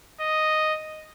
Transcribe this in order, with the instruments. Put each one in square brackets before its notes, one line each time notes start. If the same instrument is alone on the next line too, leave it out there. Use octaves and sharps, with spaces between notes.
[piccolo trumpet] D#5